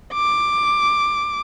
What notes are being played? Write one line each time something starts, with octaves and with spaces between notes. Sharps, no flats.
D6